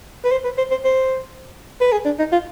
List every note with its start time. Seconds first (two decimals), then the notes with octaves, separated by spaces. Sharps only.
0.24 B4
0.31 C5
0.44 B4
0.57 C5
0.71 C5
0.84 C5
1.81 B4
1.92 G#4
2.05 D4
2.19 D#4
2.32 F4